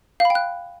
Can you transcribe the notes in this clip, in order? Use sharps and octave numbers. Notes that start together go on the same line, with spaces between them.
F5
B5
G5
F#6